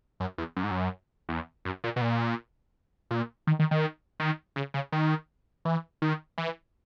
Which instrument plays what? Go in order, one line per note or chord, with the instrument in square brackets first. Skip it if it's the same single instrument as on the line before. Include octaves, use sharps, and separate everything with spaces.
[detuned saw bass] F#2
E2
F#2
G#2
F#2
E2
F#2
A#2
B2
A#2
A#2
D#3
D#3
D#3
D#3
C#3
C#3
D#3
E3
D#3
E3